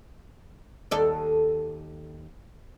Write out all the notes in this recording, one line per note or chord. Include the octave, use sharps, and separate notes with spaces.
D#2 A4 D5